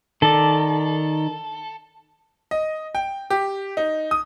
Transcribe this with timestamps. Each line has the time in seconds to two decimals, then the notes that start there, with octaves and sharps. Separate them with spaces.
0.22 D#3 A4 D5
2.51 D#5
2.95 G5
3.30 G4
3.77 D#4
4.11 D#6